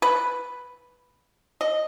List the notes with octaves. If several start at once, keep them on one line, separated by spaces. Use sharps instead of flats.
B4
D#5